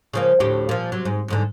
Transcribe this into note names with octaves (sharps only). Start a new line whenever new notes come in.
C#3 F3 A#3
D2 A2 G4
A#2 F3
C3 F#3
G#2
E2 G#2 D3